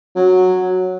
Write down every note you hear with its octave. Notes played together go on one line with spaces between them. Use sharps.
F#3